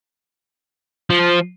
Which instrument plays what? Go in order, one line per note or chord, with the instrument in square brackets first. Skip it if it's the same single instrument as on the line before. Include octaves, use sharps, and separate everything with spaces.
[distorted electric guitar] F3